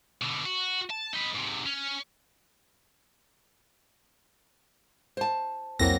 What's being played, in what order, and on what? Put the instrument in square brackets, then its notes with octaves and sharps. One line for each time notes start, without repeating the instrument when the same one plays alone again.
[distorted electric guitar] B2 D3
F#4
A5
D#4 B4
G#2 C3
C#4
[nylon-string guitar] C5 A5
[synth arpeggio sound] C2 F2 E4 [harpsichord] F#3 A#3 C4 [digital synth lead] A#6